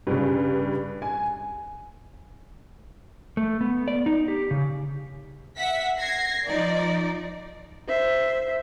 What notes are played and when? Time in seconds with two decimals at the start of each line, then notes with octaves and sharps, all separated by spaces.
0.07 G2 C#3
1.02 G#5
3.37 A3
3.61 B3
3.88 D5
4.06 D#4
4.28 G4
4.51 C#3
5.56 E5 F#5 B6
5.99 G#6 A#6 C7
6.46 F3 D#4 D5
7.88 C5 E5